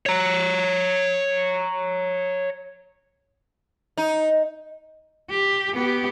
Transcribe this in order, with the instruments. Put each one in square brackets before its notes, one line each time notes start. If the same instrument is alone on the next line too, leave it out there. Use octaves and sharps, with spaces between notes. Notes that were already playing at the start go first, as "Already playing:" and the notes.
[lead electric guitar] C#5 A#5
[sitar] D#4
[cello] G4
B3 G4